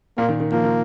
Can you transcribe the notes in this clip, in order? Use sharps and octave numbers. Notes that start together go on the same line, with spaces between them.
A#2 A#3
D#3
D#3
F3 A#3
D#3